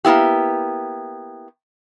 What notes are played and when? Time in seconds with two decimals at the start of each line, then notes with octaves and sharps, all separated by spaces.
0.05 A#3 B3 E4 G4